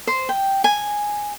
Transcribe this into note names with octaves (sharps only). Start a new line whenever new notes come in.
C5
G5
G#5